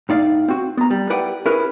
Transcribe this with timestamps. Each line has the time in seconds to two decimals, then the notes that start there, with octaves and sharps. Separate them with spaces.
0.09 A2 D#4 D5 F5
0.48 C4 F#4
0.77 B3 A#5
0.91 G3
1.10 E4 G4 B4 D5 F#5 G5
1.46 C#4 E4 G#4 A#4 B4